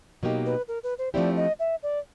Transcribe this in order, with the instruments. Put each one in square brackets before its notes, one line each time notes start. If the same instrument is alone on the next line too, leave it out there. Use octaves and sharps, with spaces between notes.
[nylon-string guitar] B2 F#3 A#3 D#4 G4
[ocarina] B4
A#4
B4
C5
[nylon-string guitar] F3 A3 C4 E4 G4 [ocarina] D5
[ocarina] D#5
E5
D5